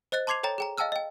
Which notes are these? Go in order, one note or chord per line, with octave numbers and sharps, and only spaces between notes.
C5 D#5 F#6 A6
A5 C6 D6 G#6 C7 F7
A4 C#5 G5 A#5 A6
G#4 G5 A#5
D#5 F5 G5 A5 E6 F6
D#5 G5